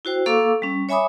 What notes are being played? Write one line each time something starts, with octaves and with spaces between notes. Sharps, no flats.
E4 F#4 C5 G5
A#3 A4 F5 C#6 D6 E6
G3 C#4
C#5 E5 G#5 B5 D6 D#6